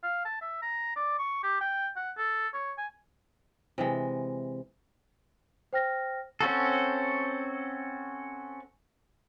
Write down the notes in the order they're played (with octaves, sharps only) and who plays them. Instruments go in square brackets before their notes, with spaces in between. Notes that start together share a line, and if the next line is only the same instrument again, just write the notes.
[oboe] F5
A5
E5
A#5
D5
C#6
G4
G5
F#5
A4
C#5
G#5
[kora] C3 E3 G#3
[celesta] C5 G5 F6 A#6
[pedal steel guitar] C4 C#4 F#4 A4